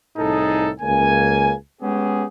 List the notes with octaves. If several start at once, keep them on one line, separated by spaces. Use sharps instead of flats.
C2 A2 D#4 G#4 A4 A5
C#2 C#3 A#3 G#5
G#3 B3 C#4 G4 G#4